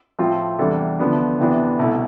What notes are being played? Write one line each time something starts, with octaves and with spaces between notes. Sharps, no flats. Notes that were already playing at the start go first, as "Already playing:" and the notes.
A2 F3 C4 F4
E2 C3 G3 D4 A4
D2 D3 F3 B3 D4
D2 C3 E3 B3 D4
C2 B2 A3 E4